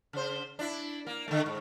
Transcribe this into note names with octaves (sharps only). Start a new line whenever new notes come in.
C#3 C5
D4 E4
A#3
D3 A3
G#2